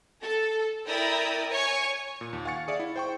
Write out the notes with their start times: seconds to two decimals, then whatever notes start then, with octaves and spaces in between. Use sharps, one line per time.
0.22 A4
0.87 E4 A#4 D5 G5 A#5 D#6
1.52 C#5 G#5 C#6
2.21 A#2
2.33 D#2
2.45 F5 F#5 G#5 C#6 A6 C#7
2.68 G#4 D5 E5 F5
2.80 E4
2.96 C5 G5 C#6